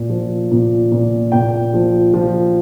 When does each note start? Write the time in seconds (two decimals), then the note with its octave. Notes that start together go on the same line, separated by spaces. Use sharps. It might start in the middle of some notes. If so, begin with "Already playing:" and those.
Already playing: A#2
0.09 F3
0.51 A#2
0.92 A#2
1.32 A#2 G5
1.74 F3
2.14 F3